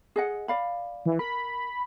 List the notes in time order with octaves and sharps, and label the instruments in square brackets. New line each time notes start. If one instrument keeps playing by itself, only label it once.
[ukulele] G#4 D#5 F#5
D5 F5 B5
[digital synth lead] E3
[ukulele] A#4 [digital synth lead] B5